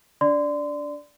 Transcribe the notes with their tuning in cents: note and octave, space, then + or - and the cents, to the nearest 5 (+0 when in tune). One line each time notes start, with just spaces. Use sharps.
D4 -25 D5 +0 C6 -30